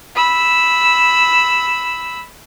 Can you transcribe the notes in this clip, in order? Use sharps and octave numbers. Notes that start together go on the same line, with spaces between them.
B5 E6